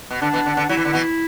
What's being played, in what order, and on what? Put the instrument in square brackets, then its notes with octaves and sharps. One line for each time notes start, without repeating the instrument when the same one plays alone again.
[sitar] B2
[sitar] D3 [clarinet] D4
[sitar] B2 E3
D3
D3
[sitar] F#3 [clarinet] E4
[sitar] E3
D3
B2 E3